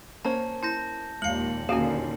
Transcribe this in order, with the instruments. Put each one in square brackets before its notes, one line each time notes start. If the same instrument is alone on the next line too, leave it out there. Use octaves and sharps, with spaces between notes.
[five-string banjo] A#3 C#4 C5 [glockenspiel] A5
[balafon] E4 [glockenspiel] A5 G6 A#6
[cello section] D#2 A#2 [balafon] G#3 F5 [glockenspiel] C#7 F#7
[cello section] D#2 A#2 D3 [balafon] C#4 F#4 G#4 [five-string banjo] F5 G#5